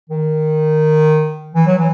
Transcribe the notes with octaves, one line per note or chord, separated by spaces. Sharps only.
D#3
E3
F#3
E3